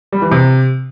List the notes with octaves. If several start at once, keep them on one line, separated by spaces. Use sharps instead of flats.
G3
E3
C3